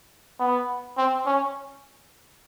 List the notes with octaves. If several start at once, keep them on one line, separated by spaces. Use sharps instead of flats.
B3
C4
C#4